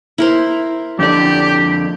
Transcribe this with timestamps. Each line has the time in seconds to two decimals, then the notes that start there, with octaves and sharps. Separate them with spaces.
0.18 E4 A#4 C5
0.99 F2 D3 G4 D5